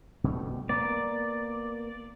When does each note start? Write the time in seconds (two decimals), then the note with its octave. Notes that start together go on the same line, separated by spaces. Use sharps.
0.24 B2 G3 A3
0.69 A#3 B3 D5